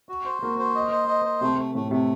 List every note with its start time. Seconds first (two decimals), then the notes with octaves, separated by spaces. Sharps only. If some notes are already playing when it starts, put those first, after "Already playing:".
0.09 F#4
0.25 C5
0.42 A#3 F#4
0.59 C5
0.75 D#5
0.92 C5
1.08 D#5
1.25 C5
1.41 C3 A3
1.58 A3
1.75 A2 A3
1.91 C3 A3